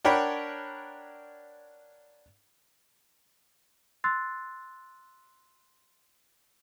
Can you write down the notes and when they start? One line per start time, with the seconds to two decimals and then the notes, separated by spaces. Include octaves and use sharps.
0.05 D4 A#4 C#5 F#5 G5 B5
4.04 C6 E6 F#6 A6 C7